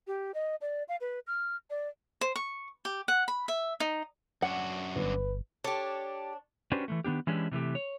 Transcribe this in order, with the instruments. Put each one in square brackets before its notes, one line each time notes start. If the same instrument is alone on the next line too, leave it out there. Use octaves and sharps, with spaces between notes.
[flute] G4
D#5
D5
F5
B4
F6
D5
[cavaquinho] C5
C#6
G4
F#5
B5
E5
D#4
[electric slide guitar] F#2 D4 F#4 [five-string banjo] F#5
[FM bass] G1 [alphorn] B4
[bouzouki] D4 C#5 [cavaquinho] G4 A4
[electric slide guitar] C#4 D4 F#4 G4 B4 C5
E3 G3 A3
D#3 B3 D4 G4
E3 G#3 C#4 D4 E4 G4
C3 E3 A3 G4
C#5